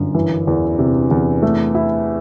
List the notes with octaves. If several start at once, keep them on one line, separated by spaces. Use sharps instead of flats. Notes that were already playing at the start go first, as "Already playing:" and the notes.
Already playing: G1 F#2
E3
E2
C3
E2
A3
E4